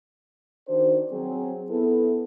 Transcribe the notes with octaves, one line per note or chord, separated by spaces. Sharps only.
D#3 D4 F#4 C5
F#3 C4 G#4
B3 E4 A4